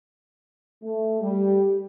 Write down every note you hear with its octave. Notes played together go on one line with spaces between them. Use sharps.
A3
G3